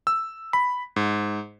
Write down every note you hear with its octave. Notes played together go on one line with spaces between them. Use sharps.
E6
B5
G#2